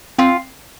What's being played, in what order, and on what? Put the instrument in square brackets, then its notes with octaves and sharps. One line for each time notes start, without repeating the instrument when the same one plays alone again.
[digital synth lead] C4 [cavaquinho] F4